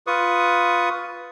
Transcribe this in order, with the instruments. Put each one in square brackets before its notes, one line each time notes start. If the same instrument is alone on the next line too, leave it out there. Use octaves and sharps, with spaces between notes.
[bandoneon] F4 B4 C#6 D#6